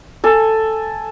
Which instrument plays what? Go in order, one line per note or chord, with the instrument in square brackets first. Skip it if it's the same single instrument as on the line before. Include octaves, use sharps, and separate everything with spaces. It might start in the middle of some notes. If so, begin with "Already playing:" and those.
[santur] A4 G#5